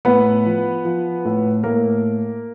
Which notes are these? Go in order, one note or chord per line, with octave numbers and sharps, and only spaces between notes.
A2 B3 B4
F3
F3
A2
A2 A#3 A#4